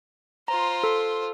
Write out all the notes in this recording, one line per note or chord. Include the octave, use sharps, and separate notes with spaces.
F4 C5 A#5
A4